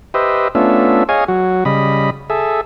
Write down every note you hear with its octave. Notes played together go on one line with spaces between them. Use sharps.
G4 B4 C5 D#5 E5
A3 B3 C#4 D4 F4 E5
G#4 C#5 D#5 F5 G#5
F#3 F#4
C#3 G3 D#5 B5
G#4 A4 E5